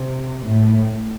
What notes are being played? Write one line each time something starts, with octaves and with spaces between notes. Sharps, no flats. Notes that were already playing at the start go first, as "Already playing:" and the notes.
Already playing: C3
A2